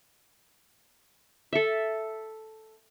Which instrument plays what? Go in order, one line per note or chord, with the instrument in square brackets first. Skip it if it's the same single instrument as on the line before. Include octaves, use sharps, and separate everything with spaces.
[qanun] A4 E5